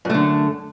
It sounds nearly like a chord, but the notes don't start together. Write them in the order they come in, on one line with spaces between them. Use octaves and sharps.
F#2 A3 D3